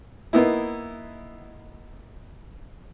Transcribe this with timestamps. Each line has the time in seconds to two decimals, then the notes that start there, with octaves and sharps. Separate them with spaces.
0.33 A#3 B3 D#4 E4